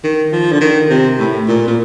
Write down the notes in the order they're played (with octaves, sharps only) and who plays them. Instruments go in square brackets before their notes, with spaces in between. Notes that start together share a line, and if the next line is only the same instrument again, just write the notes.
[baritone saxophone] D#3
F3
D3
D#3
C3
A2
A#2
A#2